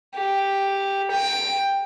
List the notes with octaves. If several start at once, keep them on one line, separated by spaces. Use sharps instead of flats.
G4
G5